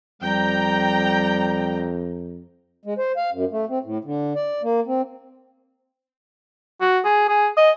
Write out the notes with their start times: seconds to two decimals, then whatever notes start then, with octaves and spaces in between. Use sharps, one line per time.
0.22 F2 G3 G5 A#5
2.85 G#3
2.98 C5
3.17 F5
3.32 F#2
3.52 A3
3.69 C4
3.84 A2
4.04 D3
4.36 D5
4.63 A#3
4.87 C4
6.81 F#4
7.05 G#4
7.29 G#4
7.57 D#5